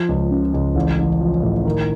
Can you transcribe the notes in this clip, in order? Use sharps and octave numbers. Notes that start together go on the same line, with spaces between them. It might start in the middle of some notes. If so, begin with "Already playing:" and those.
Already playing: F3
C#2
C#3
C#2
A1
A1
F3
A2
D#3